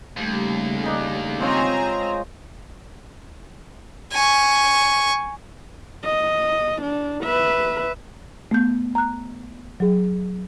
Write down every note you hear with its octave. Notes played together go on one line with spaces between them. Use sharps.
D#2 C#3 G3 A3
D4 D#4 G#4
G#3 C4 F4 G#4 C#5 A#5
G#5 C#6
D#5
D4
B4 E5
A3 B3 G6
A#5 F#6
F#3 G#4